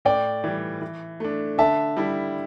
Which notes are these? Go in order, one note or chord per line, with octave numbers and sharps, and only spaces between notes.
A2 D5 G5
E3 G3
E3
A3 D4
D3 E5 A5
G3 E4